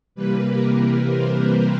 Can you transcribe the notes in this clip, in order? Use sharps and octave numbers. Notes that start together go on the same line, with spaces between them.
C3 E3 G3 A#3 B4
A#4
B4
C5
B4